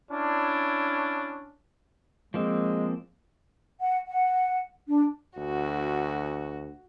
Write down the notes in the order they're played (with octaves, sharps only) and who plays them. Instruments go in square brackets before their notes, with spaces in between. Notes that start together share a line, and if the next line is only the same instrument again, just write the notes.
[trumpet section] C#4 D4 E4
[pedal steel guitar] F3 A#3 C4 [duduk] G#3
[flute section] F#5
F#5
D4
[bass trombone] D2 [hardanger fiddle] F#4